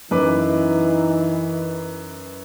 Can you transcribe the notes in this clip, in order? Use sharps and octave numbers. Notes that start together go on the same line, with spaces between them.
F#2 E3 D#4 B4 D6